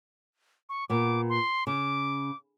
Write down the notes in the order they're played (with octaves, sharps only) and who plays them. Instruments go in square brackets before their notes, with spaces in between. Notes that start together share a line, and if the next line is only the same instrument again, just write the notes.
[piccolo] C#6
[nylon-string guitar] A#2 B3 [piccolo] D6
[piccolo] C6
[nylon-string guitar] C#3 [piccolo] D6